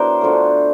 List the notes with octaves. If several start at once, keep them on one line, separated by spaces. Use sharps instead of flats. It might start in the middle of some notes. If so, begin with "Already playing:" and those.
Already playing: F#3 B3 D4 E4 A#4 C5
D3 F3 A3